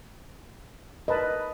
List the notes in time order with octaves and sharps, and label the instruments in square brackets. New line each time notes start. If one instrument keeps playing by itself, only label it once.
[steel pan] A#4 B4 A5 [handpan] D#5